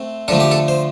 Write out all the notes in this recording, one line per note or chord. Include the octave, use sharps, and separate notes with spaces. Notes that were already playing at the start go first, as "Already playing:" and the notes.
Already playing: A3 C4
D3 F3 A3 A4
G4
A4
C5